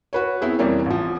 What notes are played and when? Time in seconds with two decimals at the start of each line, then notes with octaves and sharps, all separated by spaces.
0.13 F#4 B4 C#5
0.41 B3 C4 E4 G#4
0.58 F2 C3 E3 G3 A#3 C#4
0.86 A1 F3